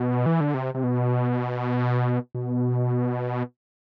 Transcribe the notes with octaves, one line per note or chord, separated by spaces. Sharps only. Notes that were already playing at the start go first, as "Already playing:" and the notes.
Already playing: B2
E3
D3
C3
C3
B2
B2